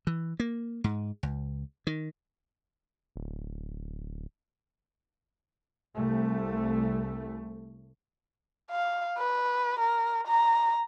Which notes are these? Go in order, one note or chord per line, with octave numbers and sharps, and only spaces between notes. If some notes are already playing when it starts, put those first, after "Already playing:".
E3
A#3
G#2
C#2
D#3
D1
C2 A3
F5
B4
A#4
A#5